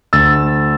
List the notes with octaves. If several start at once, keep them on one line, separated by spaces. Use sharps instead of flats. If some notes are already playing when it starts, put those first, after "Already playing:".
D2 E6 A6